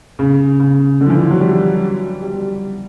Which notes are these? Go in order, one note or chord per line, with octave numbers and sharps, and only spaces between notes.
C#3
C#3
D3
F3
E3
F3
F#3
G3
G3